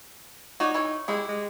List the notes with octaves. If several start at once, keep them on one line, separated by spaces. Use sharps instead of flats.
D#4 F#4 C#5 D5
E3 E4 C#5
G#3 E4 G4
G#3